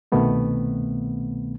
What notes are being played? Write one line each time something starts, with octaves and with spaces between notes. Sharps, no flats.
C2 B2 D#3 A3 B3 C4